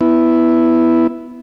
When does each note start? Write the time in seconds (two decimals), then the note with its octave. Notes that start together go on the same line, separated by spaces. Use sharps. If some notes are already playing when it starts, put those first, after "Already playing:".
0.01 B3 E4